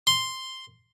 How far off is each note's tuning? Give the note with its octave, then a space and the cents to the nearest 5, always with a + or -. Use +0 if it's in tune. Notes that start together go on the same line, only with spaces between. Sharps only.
C6 +0